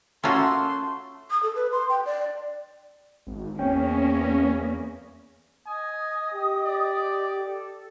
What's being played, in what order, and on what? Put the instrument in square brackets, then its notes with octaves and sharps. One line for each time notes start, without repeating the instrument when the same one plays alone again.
[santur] A3 A5 E6 [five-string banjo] A#3 F#4 [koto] C#4 F4 [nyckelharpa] C6
[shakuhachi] D#6
A4
B4
C6
G5
D5
[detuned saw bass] G#1
[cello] E2 A#3 [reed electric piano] C4 C#5 G5 [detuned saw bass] C#4
[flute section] D#5 D#6 [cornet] G#5
[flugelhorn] G4
[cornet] D5
[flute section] A4